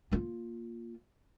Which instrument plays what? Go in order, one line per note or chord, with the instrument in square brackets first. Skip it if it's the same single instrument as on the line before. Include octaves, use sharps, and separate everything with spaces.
[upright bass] A#3 F4